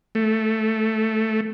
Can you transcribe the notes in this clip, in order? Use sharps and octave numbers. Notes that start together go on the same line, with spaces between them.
A3